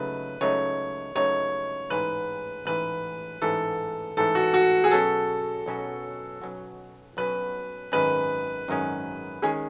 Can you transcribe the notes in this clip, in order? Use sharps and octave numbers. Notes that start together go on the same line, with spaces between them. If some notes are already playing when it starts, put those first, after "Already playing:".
Already playing: C#2 C#3 F#3 A3 D#4 B4
C#2 C#3 F#3 A3 D#4 C#5
C#2 C#3 F#3 A3 D#4 C#5
A1 G#2 E3 B4
A1 G#2 E3 B4
A1 G#2 E3 A4
A1 G#2 E3 A4
F#4
F#4
G#4
B1 B2 F#3 C#4 F#4 A4
B1 B2 F#3 C#4 F#4
B1 B2 F#3 C#4 F#4
B1 B2 F#3 C#4 F#4 B4
G#1 F#2 D#3 G#3 C#4 B4
G#1 F#2 D#3 G#3 C#4
D#3 G#3 C#4 G#4